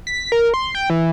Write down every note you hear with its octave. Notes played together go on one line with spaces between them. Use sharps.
B6
A#4
C6
G5
E3